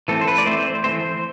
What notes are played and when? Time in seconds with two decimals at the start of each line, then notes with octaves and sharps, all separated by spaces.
0.08 E3 A3 C4 A4
0.21 C5
0.28 B4
0.38 D5
0.46 E3 A3 C4 C5
0.59 C5
0.84 E3 A3 C4 C5